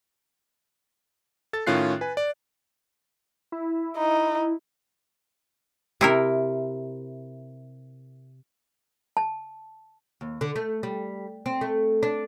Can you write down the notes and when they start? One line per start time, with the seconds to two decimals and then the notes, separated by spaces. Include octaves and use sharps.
1.53 A4 A6
1.67 A2 D#3 C#4 F4 F#6 C7
2.01 B4 G#5
2.17 D5
3.52 E4
3.97 D#4
6.01 C3 E4 A#4
9.17 A5
10.21 D#2
10.41 D3
10.56 A3
10.83 G3
11.46 C4
11.61 A3
12.03 D4